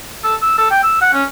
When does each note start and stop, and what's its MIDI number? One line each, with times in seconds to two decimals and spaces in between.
0.24 0.35 69
0.42 0.56 88
0.58 0.67 69
0.70 0.82 79
0.83 0.97 88
1.01 1.13 78
1.13 1.24 61